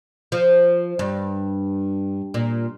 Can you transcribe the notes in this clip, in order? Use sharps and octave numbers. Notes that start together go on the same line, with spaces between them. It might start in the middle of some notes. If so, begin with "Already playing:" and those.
F3
G2
A#2